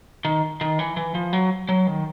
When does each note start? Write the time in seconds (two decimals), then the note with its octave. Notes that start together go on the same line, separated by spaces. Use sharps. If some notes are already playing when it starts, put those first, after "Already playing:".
0.25 D#3
0.61 D#3
0.79 E3
0.97 E3
1.15 F3
1.33 F#3
1.69 F#3
1.87 D#3